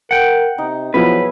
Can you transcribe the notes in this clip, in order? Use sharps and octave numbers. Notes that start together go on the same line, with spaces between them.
A#4 F#5 G5
C3 D#4
B2 F3 F#3 B3 E4 G#4 B4